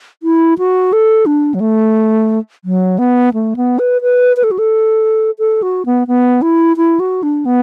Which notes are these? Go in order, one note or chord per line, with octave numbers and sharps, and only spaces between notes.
E4
F#4
A4
D4
F#3
A3
F#3
B3
A3
B3
B4
B4
B4
A4
F#4
A4
A4
F#4
B3
B3
E4
E4
F#4
D4
B3